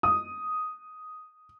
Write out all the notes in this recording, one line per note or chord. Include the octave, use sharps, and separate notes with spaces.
D#6